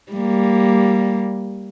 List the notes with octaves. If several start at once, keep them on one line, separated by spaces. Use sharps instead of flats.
G3 A#3